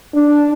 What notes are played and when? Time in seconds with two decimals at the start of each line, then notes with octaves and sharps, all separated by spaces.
0.14 D4